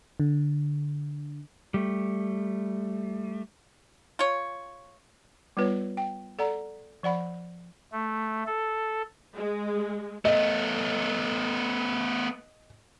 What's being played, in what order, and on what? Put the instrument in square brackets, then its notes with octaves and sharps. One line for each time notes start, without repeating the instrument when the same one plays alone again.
[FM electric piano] D3
[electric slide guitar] G3 A3
[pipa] F4 C#5
[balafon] G3 B3 F4 B4 C#5
G5
A4 D5 F#5 A#5
F3 D5 F#5 B5
[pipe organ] A3
A4
[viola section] G#3
[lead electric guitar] A3 B3 [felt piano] D#5